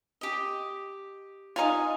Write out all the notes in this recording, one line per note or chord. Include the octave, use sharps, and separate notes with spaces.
G4 D#5
D#4 F4 D#5 F5 G#5